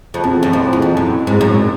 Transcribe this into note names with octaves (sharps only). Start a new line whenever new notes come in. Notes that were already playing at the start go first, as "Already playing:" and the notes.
F2
E2 C4
F#2
F2
E2
F2
F#2
G#2
F#2